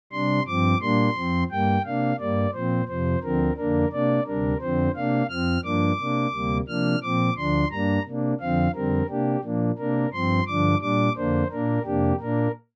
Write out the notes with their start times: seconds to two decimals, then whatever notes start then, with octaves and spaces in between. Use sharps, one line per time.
0.12 C3 G3 D4 C6
0.47 G2 F3 C4 D6
0.81 A#2 G3 A#3 D4 C6
1.16 F2 F3 C4
1.50 G2 G3 A#3 G5
1.85 C3 A#3 D4 F5
2.19 G2 G3 A#3 D5
2.54 A#2 F3 C4 C5
2.88 F2 C3 F3 C5
3.23 D2 D3 F3 C4 A#4
3.57 F2 D3 A#3 D4 A#4
3.92 C3 A#3 D4 D5
4.26 D2 C3 G3 D4 A#4
4.60 F2 D3 F3 C4 C5
4.95 C3 A#3 D4 F5
5.29 F2 F3 C4 F6
5.64 G2 F3 A#3 D4 D6
5.99 C3 A#3 D4
6.33 D2 C3 G3 A#3
6.68 C3 F3 A#3 D4 F6
7.03 A#2 F3 C4 D6
7.37 D2 D3 F3 D4 C6
7.71 G2 G3 A#3 D4 A#5
8.06 C3 A#3 D4
8.40 F2 D3 F3 C4 F5
8.75 F2 D3 G3 C4 A#4
9.09 C3 A#3 D4 G4
9.43 A#2 F3 A#3 D4
9.78 C3 A#3 D4 A#4
10.13 G2 F3 C4 C6
10.47 G2 D3 F3 D4 D6
10.81 A#2 G3 D4 D6
11.16 F2 D3 A#3 D4 C5
11.51 A#2 A#3 D4 A#4
11.85 F2 C3 A#3 D4 G4
12.20 A#2 A#3 D4 A#4